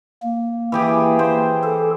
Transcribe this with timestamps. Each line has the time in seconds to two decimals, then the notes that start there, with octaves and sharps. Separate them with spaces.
0.23 A#3
0.72 E3 G4 G#4
1.19 C5
1.63 A4